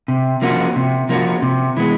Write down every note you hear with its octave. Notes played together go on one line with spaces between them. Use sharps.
C3
F3 A#3 C#4 F#4
C3
F3 A#3 C#4 F#4
C3
E3 G#3 B3